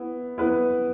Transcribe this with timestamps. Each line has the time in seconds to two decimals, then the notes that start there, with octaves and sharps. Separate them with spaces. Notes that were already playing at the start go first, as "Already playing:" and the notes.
Already playing: B3 E4
0.38 B3 E4 B4